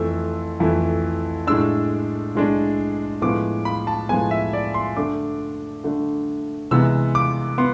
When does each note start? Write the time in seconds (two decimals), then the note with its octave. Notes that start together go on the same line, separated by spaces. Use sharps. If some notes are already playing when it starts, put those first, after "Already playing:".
Already playing: F2 E3 A3 E4 E6
0.60 F2 E3 A3 E4
1.47 A2 G#3 D4 E6
2.35 A2 G#3 D4
3.22 A2 F3 G#3 B3 D6
3.65 B5
3.87 A5
4.09 A2 F3 G#3 B3 G#5
4.31 E5
4.53 D5
4.74 C6
4.97 D3 A3 D4 D6
5.84 D3 A3 D4
6.71 C3 E3 G#3 B3 E6
7.15 D6
7.58 B3 C6